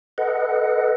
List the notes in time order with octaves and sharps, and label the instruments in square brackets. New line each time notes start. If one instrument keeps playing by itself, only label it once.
[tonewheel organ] A4 B4 D#5 F#5